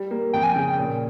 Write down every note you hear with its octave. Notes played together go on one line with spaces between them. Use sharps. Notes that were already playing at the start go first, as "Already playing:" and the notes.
Already playing: G3
A#3
F2 G5
G#5
C#3 G5
A#2